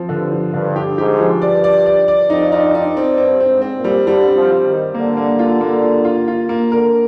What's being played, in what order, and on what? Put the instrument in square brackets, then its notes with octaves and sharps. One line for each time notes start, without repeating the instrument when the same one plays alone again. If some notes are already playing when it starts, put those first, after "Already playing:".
Already playing: [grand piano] F3 C4
[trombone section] G2 [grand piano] D3
[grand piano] F3
[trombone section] G2 [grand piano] D3
[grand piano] G4
[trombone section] G#2 [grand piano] G4
[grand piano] F3
[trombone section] G2 [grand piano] D5
[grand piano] D5
D5
D5
[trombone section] F2 [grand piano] D#4
[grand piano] D#4
D#4
C4
[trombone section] G2 [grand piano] C4
[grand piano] C4
[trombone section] G#2
[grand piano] C4
[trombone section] A#2
[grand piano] G3
[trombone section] D3 [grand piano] G3
[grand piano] C4
[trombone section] F3
[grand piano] G3
[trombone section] D#3
[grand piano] G3
[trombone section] D3 [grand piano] A#3
[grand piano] A#3
F4
A#3
F4
F4
F4
A#3
[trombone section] D3 [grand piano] A#4